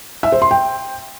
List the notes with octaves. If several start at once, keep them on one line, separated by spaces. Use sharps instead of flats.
E5
C5
C6
G5